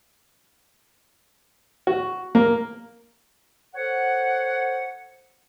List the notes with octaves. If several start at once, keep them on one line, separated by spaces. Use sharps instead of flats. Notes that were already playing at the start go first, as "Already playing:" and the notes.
F#4
A#3
A4 C5 C#5 F#5